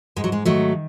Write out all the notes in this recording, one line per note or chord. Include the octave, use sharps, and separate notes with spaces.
G#2 G#3
F#3
G#3
D#3 F#3 A3